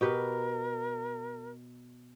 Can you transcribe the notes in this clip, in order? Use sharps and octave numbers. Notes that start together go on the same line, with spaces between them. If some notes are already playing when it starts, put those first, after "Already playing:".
B2 G4 A#4 B4